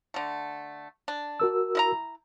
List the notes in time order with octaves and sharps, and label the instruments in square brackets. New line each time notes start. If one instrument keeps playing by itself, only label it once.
[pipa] D3 A3
D4
[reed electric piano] F#4 A#4 E6
[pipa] E4 D#5 A#5